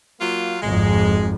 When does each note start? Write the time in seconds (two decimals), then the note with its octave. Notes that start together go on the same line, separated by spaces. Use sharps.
0.20 F#3 A#3 F4
0.62 G#1 F2 G#3